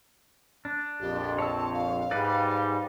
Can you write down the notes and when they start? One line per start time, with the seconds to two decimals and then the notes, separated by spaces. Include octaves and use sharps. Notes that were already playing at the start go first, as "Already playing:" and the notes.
0.65 D4
1.00 A#1 F2 G4
1.39 C#5 A5 E6
1.73 F5
2.11 G#2 G3 D#4 B4 D5